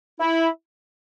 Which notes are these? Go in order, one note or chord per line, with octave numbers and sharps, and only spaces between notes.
E4